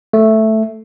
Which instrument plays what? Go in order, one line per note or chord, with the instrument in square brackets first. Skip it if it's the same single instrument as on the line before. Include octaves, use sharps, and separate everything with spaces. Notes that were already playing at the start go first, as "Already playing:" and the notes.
[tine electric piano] A3